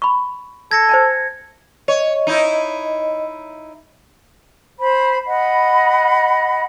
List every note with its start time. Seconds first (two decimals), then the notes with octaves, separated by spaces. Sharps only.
0.02 B5 C#6
0.71 A4 G#6 A#6 C#7
0.89 C5 G#5 A5
1.88 C#5 D#5
2.27 D#4 E4
4.78 C5 B5
5.28 D#5 F#5 B5